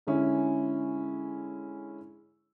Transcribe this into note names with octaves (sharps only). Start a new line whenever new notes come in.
D3 G#3 C#4 E4